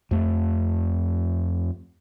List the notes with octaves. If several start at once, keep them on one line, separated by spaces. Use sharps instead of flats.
F2 A3